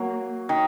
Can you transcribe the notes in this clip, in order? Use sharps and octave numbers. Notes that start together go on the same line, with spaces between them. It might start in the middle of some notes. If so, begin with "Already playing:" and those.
Already playing: F#3 A#3
D#3